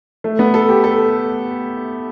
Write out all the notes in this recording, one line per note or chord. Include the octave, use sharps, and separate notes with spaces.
A3
B3
A4
G4
A4